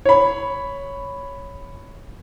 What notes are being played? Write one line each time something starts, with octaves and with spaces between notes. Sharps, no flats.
C#5 B5